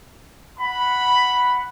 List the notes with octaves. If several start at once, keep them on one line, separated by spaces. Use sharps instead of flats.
F#5 B5